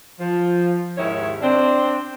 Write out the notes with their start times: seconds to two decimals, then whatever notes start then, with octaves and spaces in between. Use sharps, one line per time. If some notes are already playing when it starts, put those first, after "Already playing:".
0.19 F3
0.98 D#2 G#2 D#3 C#4 E4 C#5
1.42 C4 D4